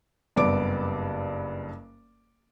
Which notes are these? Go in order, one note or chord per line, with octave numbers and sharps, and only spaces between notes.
F#1 G2 B3 D5 D6 D7